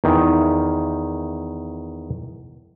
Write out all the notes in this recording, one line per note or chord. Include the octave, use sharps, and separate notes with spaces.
E2 D#3